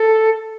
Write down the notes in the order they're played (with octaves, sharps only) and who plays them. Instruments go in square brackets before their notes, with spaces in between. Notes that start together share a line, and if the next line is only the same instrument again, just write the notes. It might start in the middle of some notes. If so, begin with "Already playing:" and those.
Already playing: [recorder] A4